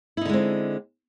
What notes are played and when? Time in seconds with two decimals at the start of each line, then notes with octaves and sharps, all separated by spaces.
0.17 E4
0.21 D#4
0.25 D3
0.29 G#3
0.33 C4